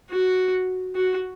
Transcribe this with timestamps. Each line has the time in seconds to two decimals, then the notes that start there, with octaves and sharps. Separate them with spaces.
0.11 F#4
0.95 F#4